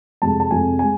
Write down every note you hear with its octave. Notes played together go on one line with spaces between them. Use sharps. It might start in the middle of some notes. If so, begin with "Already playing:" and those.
F2 C3 G#3 A5
A5
F2 C3 G#3 G#5
G#3 G#5